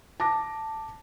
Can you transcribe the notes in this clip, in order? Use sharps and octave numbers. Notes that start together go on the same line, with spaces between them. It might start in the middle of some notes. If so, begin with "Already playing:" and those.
A5 D6 A#6